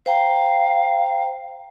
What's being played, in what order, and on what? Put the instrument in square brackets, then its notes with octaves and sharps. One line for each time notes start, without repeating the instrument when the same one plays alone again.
[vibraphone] C5 G5 A#5 [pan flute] F5